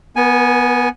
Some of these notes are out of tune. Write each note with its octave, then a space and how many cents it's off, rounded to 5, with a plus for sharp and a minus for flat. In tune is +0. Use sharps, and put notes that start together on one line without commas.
B3 -10 A#4 +40 G#5 +0